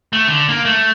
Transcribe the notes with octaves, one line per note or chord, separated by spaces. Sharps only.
A3
D3
A#3
A3